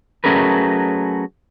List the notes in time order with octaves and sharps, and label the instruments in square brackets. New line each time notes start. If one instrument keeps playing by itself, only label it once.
[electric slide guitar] F#3 A3 C#4 G#4 A#4 B4